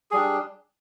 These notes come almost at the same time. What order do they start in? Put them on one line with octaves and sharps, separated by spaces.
G#4 G3 D4